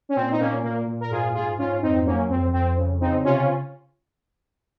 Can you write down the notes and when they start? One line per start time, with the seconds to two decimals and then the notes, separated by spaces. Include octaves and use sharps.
0.09 C#4
0.15 A#2 C4
0.31 D#4
0.40 A#2 A#3 C#4
0.63 A#2 A#3
0.87 A#2
1.00 A#4
1.11 G#2 F4 G#4
1.34 G#2 F4 G#4
1.58 G#2 C#4 F4
1.82 F2 C4 D#4
2.05 F#3 A#3 C#4
2.29 F2 C4
2.53 F2 C4
2.77 C#3
3.00 C#3 C4 D#4
3.24 C3 C#4 F4